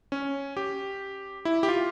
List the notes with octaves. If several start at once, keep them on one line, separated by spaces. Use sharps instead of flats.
C#4
G4
E4
G4
F4